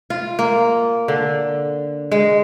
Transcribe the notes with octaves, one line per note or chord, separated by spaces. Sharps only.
F4
A#3
D3
G#3